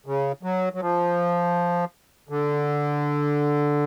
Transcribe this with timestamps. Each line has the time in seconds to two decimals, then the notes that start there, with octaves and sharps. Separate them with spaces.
0.06 C#3
0.43 F#3
0.74 F#3
0.80 F3
2.29 D3